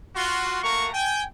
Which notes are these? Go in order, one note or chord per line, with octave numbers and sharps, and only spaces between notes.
F4 F#4 C6
A3 A#3 F#4 A#4 A#5 C#6
G5 G#5